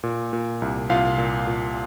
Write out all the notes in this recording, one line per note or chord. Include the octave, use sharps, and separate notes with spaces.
A#2
A#2
C2
C2 F4 F5
A#2
A#2